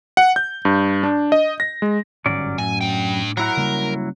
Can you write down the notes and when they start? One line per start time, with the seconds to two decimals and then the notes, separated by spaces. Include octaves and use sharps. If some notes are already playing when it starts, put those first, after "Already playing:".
0.17 F#5
0.36 G6
0.65 G2
1.03 D4
1.32 D#5
1.60 A#6
1.82 G#3
2.26 G1 G#2 F#3 C#4 D5
2.58 F#2 A2 G#5
2.81 D4 G5
3.37 F#3 E4 A#4 F#5
3.57 C#3 G3 A#3